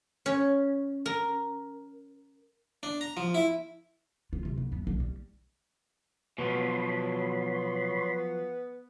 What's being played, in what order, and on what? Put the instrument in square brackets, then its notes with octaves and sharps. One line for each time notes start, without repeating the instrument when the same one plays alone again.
[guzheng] C#4
A#4
[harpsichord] D4
A#5
F3
E4
[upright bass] F4
C3
B3
F#2
A#1
G3
[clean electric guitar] B2 [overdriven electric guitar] F3 F#3 [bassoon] B3 [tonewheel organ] C#5 B5 C6